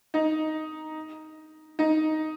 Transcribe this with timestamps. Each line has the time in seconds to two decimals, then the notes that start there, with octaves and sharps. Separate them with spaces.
0.14 D#4
1.79 D#4